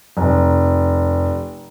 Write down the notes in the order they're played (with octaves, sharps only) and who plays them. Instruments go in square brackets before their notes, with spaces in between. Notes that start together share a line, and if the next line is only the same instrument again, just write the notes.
[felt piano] F1